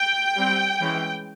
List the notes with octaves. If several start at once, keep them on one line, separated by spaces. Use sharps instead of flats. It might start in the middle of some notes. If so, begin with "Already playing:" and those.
Already playing: G5
G3 C4
E3 G#3 C#4